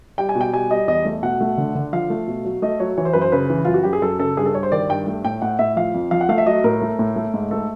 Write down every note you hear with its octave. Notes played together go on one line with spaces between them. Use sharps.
G3 G5
G#5
B2
G5
G3 G#5
G3 D#5
E2 D#5
A3
B2 F#5
A3
D3
D3
F3 F5
A3
B2
F#3
A3 D#5
F#3 C#5
E3 C#5
C5
F#2 B4
C5
C#3 B4
E3
F#2 F4
F#4
F#2 G4
G#4
F#2 A4
C#3 A4
G2 G#4
A4
G2 C#5
C5
D#3 D5
G2 G5
A3
A2 G5
A2 F#5
A2 E5
F3 F5
F2
F3 F5
F#5
A3 F5
E5
F#3 D#5
A2 A#4
A3
A2
A3
G#2
A3 A4